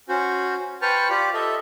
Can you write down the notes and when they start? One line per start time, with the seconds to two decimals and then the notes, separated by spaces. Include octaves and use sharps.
0.09 C#4 F#4 C5
0.82 B4 C5 G5 A5 C#6 F6
1.10 F4 G4 C5 D5
1.34 A4 D#5 E5